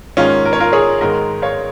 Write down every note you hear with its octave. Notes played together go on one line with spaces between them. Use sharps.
G#2 D#3 A#3 C#4 F4
A#4
C#5
F4 A#4
G#4 C#5
G#2 D#3 G#3 A#4 D#5
C#5 F5